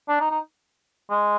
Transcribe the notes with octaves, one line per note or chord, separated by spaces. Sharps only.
D4
D#4
D#4
G#3